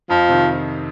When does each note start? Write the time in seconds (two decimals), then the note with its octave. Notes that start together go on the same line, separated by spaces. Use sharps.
0.10 F2 F3
0.29 C3 D#3